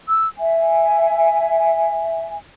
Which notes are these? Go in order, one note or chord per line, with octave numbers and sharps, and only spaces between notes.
E6
E5 G#5